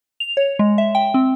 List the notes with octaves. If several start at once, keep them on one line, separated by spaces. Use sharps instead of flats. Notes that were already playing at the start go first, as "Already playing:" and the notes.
F7
C#5
G#3
E5
G5
C4